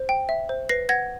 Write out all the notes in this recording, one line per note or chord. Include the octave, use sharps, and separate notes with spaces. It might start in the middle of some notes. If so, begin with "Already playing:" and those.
Already playing: C5
G5
E5
C5
B4 A#6 C7
F#5 G#6 A#6